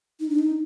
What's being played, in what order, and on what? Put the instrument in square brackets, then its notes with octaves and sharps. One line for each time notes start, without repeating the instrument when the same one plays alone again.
[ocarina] D#4
D4
D#4